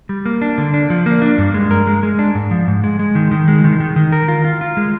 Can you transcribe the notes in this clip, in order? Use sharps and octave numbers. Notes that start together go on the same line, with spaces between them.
G3
A#3
D4
D3
D4
F3
A#3
D4
G2
G#3
A#4
G#3
G#3
D4
G#2
F3
G#2
G#3
G#3
D#3
D#3
G#3
D#3
D#3
D#3
A#4
F4
F4
F4
G#3